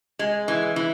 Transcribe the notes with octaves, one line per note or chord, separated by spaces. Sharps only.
G#3
E3
E3